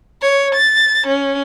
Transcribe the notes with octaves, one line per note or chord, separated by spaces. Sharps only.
C#5
A6
C#4